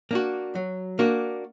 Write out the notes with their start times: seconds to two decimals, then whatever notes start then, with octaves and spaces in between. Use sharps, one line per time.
0.11 A#3 D4 F#4
0.55 F#3
0.99 A#3 D4 F#4